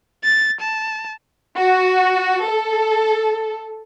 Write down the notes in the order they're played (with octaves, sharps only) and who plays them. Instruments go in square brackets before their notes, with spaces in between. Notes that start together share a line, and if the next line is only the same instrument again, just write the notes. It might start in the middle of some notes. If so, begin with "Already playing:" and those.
[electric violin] A6
A5
[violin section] F#4
A4